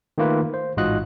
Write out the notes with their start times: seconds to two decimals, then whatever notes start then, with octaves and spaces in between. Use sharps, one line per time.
0.18 D#3 A3 A#3 F4 B4
0.54 C5
0.77 A1 G#2 F4 F#4 D#5 F#6